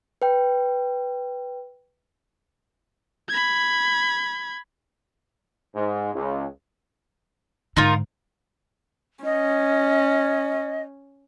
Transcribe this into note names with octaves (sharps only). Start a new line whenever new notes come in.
B4 G5
B5 G#6
G#2
C#2
G#2 D3 D#4 F4 A#4
C#4 D#5